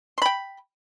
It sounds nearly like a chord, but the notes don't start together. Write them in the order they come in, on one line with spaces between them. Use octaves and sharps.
C6 B5 G5